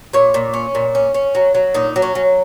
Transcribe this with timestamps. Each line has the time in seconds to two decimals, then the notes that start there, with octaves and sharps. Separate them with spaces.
0.13 A#2 C#5
0.34 A#2
0.53 C#4
0.75 A#2
0.95 C#4
1.14 C#4
1.35 F#3
1.55 F#3
1.74 A#2 D#4
1.96 F#3
2.02 C#4
2.15 F#3